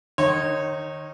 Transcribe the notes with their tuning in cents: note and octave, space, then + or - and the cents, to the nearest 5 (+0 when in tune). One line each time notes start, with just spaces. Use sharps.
D#3 -30 D#4 +0 C#5 -25